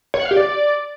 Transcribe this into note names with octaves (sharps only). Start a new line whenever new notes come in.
C#5
F#5
F5
G4
D5